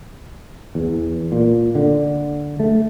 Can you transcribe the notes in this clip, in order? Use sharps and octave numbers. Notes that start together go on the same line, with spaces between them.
E2
A#2
D3
A3